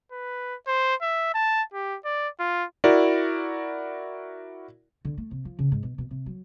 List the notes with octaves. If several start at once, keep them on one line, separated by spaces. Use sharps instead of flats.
B4
C5
E5
A5
G4
D5
F4
E4 F#4 A#4 D5
D3
A3
C3
F3
C#3
G#2
B2
B2
C3
F#3